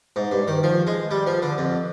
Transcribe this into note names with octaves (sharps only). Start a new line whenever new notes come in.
G#2
G2
D#3
F3
G#3
G3
F3
D3
F2